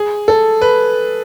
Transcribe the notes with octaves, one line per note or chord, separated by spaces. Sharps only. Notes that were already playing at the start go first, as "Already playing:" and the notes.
Already playing: G#4
A4
B4